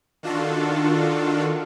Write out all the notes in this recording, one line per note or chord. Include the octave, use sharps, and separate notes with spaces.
D#3 D4 F4 F#4 A4